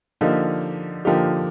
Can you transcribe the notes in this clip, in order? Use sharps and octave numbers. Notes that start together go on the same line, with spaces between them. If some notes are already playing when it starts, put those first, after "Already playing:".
D3 F3 A#3 D#4 G4
D3 F3 A#3 D#4 G4